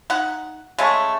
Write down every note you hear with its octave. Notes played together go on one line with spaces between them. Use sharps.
D#4 F#5
C#3 G#3 A3